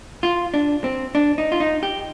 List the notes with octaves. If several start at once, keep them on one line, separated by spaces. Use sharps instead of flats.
F4
D4
C4
D4
D#4
F4
D#4
G4